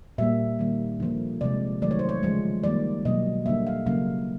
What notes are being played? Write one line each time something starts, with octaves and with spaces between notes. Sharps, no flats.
A#2 G3 A#3 E5
D#3 G3 A#3
D3 F3 A#3
C3 F3 G#3 D5
D#3 F#3 A3 D5
C#5
C5
C#5
C#3 F3 G#3
D#3 G3 A#3 D5
B2 F#3 A#3 D#5
D3 G3 A#3 E5
F5
C#3 F#3 A#3 F5